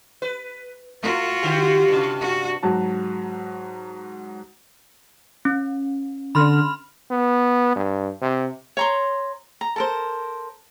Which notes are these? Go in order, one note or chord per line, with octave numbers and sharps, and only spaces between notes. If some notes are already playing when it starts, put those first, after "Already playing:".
B4
A3 F4 F#4
D3 G4
G2 C3
F#4
G#2 F#3 F#4 A5
C#4
D3 B5 C6 F6
B3
G2
C3
C#5 A#5 C6
A#5
A4 A#4 C5